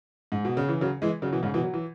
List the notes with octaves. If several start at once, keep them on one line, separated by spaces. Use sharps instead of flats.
G#2
B2
C#3
E3
C#3 F#3
E3 G#3
C#3 F#3
B2 E3
G#2 C#3
B2 E3
F#3
E3